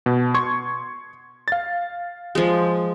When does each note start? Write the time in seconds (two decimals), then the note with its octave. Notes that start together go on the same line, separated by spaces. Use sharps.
0.06 B2
0.34 C6 C#6 G#6
1.48 F5 A6
2.35 F3 G#3